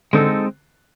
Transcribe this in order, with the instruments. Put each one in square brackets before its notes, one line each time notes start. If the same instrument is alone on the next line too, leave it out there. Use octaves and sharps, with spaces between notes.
[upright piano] D3 [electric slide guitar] G#3 C4 D#4 F#4 A4